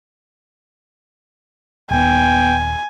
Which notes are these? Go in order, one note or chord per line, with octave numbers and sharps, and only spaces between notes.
D#1 D#2 B3 G5 G#5